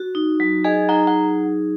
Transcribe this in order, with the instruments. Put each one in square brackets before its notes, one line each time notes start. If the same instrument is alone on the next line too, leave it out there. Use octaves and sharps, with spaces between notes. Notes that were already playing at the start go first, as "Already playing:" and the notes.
Already playing: [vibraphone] F#4
D#4
F#3
[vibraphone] G#4 [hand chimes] D#5 G#5
[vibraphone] D#4 [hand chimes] F#5 A#5
[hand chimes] F#5